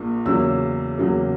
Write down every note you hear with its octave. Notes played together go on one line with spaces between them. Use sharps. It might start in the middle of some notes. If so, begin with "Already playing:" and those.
Already playing: A#1 A#2 A#3
E2 C#3 F#3 A#3 E6
E2 C#3 F#3 A#3